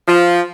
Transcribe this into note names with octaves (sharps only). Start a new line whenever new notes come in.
F3